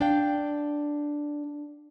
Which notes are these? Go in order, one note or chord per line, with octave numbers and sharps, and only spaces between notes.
D4 D5 F5 G5